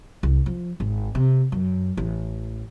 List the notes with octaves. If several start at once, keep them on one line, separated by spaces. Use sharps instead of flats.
C2
F3
G#1
C3
F#2
A1